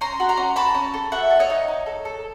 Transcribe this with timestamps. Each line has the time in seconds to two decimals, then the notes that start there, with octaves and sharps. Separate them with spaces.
0.01 C#4 A#5 C6
0.20 F#4
0.29 A#5 C6
0.37 C#4
0.56 F#4 A5 B5
0.74 C#4
0.94 A4
1.12 F#4 E5 F#5
1.30 A4
1.39 C#5 D#5
1.50 D#4
1.68 D#4
1.86 A4
2.05 A4